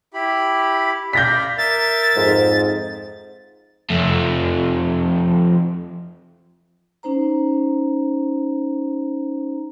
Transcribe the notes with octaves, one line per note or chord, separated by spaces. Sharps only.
E4 G4 B5
D5 F5 G6 A#6 B6
A#4 E5 A6
F2 G#2
F2 A3
C#4 D#4 C5 A#5